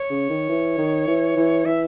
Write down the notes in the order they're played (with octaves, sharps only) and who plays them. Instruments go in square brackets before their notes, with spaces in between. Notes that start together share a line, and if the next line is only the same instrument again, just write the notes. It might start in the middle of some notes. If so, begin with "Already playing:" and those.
Already playing: [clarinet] C#5
[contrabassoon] C#3
D#3
E3
D#3
E3
E3
[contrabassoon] E3 [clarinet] E5